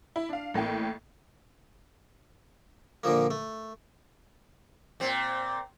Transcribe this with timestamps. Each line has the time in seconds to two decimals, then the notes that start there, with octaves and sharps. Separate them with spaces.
0.16 E4
0.29 D4 F5
0.54 A1 A2 A#3 G5
3.03 A#2 D3 F3 A#3
3.31 A3
5.00 A#2 C4